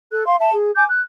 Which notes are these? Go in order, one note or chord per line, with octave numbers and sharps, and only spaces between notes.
A4 F#6
F5 C6
E5 A5
G#4
G#5 D6 G6
F#6